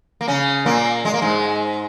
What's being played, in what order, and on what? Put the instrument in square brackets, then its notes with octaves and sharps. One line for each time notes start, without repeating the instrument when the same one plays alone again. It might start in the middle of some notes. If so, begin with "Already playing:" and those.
[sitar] A#3
C#3 C#4
A#2 A#3
G#3
A#3
G#2 G#3